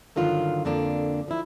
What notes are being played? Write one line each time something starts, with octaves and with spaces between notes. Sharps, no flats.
G2 D3 D#3 F#3 F4
F2 D3 A#3 D4
F3 E4